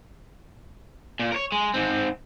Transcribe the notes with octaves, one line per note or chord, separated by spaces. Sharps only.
A#2
A#4 C#5
G#3
G#2 C4